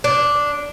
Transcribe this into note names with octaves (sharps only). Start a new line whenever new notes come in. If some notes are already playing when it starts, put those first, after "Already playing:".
D4